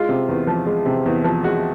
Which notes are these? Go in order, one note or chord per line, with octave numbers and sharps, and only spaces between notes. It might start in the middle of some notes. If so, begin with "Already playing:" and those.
Already playing: G#3 F4
C3
E2
F3
G#3
C3
E2
F3
G#3 F#4